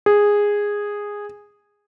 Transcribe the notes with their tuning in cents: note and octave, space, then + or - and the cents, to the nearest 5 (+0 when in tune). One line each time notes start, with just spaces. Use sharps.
G#4 -10